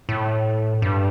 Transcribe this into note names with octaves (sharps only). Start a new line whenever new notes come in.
A2
G2